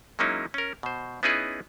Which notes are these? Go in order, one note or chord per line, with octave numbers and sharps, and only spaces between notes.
F#3 G#3 A#3 C#4 D#4 E4
C#4 A#4
B2 C5
B3 C#4 D#4 E4 G#4 B4